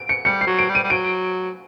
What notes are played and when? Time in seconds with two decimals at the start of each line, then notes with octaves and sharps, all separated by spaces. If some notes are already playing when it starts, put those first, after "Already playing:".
Already playing: D7
0.09 C#7
0.25 G3 C#7
0.41 C7
0.47 F#3
0.59 D7
0.69 G3
0.75 D#7
0.83 G3
0.90 F#3 D7